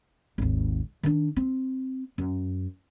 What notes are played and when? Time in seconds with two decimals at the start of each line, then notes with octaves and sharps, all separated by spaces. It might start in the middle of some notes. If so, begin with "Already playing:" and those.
0.38 G#1 D#2
1.03 D#3 D4
1.36 C4
2.18 F#2